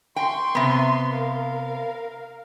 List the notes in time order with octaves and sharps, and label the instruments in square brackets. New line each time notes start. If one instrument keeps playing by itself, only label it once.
[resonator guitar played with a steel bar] G5 [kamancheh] C6 C#6
[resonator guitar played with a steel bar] C3 B3
[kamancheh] A#4 F5